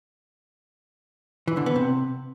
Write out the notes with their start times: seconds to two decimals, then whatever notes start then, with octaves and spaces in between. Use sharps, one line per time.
1.48 E3
1.57 D3
1.66 B3
1.76 C3